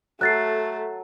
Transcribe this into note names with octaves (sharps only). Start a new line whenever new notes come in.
F#3 A3 A4 F#6 A6 C7